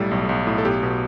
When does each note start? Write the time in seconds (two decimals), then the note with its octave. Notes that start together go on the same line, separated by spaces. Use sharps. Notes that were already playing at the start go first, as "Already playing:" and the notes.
Already playing: B1 A2 G3 A4
0.11 B1
0.29 B1
0.47 A2
0.58 A4
0.65 B1 G4
0.83 B2